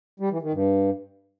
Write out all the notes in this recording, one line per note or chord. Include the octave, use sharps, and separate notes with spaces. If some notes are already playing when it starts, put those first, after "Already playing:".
G3
E3
D#3
G2